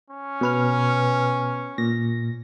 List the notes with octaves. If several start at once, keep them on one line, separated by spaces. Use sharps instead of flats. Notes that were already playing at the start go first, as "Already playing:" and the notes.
C#4
B2 B4 F6
A#2 A#6